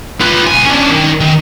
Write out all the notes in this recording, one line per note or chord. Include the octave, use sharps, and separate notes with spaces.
F4 B4
B1 G#5
C#4 D4
D#3
D#3